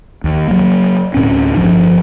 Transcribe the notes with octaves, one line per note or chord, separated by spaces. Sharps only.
D#2
F#3 A#3
D2 A2 C4 C#4
G1 F3 D4